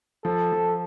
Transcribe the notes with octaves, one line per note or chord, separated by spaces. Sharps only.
F3 A4
F3